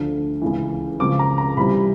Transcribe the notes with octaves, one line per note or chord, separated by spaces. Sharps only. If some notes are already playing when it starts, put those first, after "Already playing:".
Already playing: D2 D3 F3 A3 D4
C#2 C#3 E3
C#2 C#3 F3 D6
A#5
A#5
C3 E3 G3 C4 F4 B5